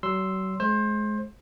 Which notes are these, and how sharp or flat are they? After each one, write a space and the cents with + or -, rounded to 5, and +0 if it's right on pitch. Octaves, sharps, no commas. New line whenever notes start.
F#3 +40 C6 +0 E6 +0
G#3 +30 C5 +25